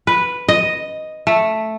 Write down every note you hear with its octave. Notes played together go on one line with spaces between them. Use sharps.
B4
D#5
A3